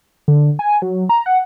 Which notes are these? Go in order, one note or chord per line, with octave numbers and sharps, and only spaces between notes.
D3
G#5
F#3
A#5
F#5